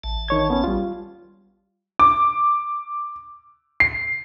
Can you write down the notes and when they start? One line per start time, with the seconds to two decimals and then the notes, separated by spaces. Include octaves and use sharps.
0.04 A1 A5
0.28 D#3 C#5 G#6
0.50 B3 C#4
0.64 G3 F4
1.99 D6
3.80 C7